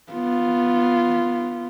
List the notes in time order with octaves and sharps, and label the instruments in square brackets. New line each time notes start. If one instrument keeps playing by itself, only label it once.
[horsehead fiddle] B3 F4